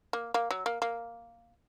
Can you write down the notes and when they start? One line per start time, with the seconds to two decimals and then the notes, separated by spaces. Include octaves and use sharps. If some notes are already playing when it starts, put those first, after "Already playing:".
0.13 A#3
0.34 A#3
0.51 F#3
0.66 A#3
0.82 A#3